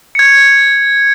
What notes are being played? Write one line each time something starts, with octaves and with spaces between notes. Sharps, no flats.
G#6 C#7